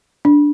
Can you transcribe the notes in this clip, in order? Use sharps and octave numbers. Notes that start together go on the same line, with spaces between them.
D4